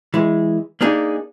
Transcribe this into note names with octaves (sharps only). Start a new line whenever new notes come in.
E3 G#3
A#3 D4 D#4 G#4